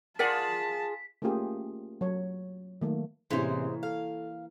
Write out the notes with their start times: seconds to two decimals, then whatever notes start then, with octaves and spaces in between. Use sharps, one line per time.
0.19 F4 G#4 A#4 D5 F#5 A5 B6
1.22 A3 A#3 C#4 F4 G4 G#4
2.01 F#3 C#5
2.81 D#3 F#3 A3 A#3
3.31 A1 C3 E3 G#3 A#3 G4 C5 C#5
3.83 A4 F5